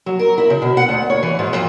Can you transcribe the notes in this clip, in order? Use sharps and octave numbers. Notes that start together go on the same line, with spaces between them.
F#3
A#4
E4
C#3
B2
F#5
D2
C#5
E3
G#2
F2